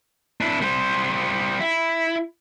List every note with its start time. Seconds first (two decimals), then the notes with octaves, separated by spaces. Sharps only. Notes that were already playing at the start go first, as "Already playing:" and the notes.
0.41 D4 E4
0.61 G3 C5
1.60 E4